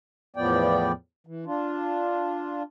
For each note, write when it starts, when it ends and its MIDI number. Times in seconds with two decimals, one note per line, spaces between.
0.36 0.92 40
0.36 0.92 45
0.36 0.92 53
0.36 0.92 59
0.36 0.92 74
0.36 0.92 79
1.27 1.45 52
1.46 2.63 62
1.46 2.63 65